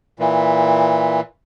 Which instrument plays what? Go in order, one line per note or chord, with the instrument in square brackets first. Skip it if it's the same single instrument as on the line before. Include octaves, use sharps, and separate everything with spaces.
[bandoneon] A#2 E3